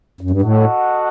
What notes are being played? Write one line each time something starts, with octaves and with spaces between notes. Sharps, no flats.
F#2
G2
A2 F#4 A4 D#5 F#5